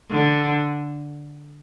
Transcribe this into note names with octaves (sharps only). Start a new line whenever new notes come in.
D3